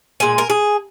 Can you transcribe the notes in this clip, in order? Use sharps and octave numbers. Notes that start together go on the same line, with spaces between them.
A#2 G#3 G#5
A#4
G#4